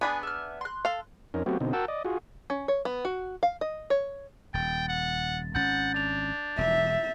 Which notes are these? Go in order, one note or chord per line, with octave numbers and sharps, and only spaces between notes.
B3 D4 G#4 G#5 B5
E5 F6
C6 F#6
A4 F5
F2 C#4 D#4 A#4
F#3 A3 B3 C4 F#4 G4
B2 D3 C4 D#4
F#4 A#4 F#5 G5 A5 E6
D5 D#5
F4 F#4 G#4
C#4
C#5
B3
F#4
F5
D#5
C#5
D#1 G5 A6
F#5
G#1 C#4 F#5 G6 A6
D4 A6 F7
E1 E5